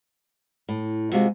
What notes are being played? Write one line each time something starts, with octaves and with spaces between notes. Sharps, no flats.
A2
C3 G#3 F4 F#4 E5